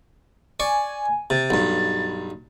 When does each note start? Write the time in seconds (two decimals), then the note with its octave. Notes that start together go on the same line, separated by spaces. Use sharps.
0.60 D5 G#5 C#6
1.30 C3 A6
1.50 B1 G2